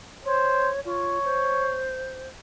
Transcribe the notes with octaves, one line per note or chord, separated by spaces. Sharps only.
C5 C#5
F4 C#5
C5